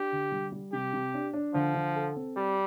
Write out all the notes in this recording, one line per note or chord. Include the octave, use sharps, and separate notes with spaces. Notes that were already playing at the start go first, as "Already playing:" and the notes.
Already playing: D4 G4
D3
G3
G3
C3 G4
C3
D4
D4
D3 F3
D3
A4
C4
G3 G4